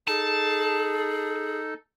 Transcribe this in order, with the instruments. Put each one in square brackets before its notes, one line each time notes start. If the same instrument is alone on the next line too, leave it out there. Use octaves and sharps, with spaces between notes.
[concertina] D#4 A4 [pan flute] G#4 [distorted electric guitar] A5